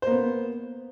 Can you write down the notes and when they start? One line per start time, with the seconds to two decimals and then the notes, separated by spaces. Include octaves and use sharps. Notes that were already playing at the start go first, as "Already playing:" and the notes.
0.02 C5
0.07 A#3
0.11 B3